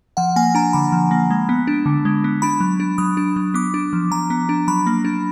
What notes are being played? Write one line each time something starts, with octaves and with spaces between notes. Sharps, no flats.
F3 F#5
A#3 G#5
D4 A#5
D3 B5
F3
A#3
G#3
B3
D4
D3
G#3
B3
D4 B5
F#3
D4
F#3 D#6
D4
F#3
B3 D6
D4
F3
F3 A#5
B3
D4
F#3 B5
A#3
D4